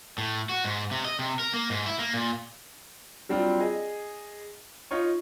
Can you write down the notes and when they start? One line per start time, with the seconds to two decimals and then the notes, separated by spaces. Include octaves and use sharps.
0.18 A2
0.49 F#4
0.65 G#2
0.91 C3
1.05 D#5
1.19 C3
1.39 A#4
1.54 A#3
1.70 G#2
1.86 E4
1.99 A#3
2.13 A#2
3.29 F#3 G3 C4 D4 F4
3.60 G#4 D#5
4.91 D#4 F4 C#5 C#6